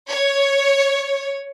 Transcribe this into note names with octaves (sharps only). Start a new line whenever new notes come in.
C#5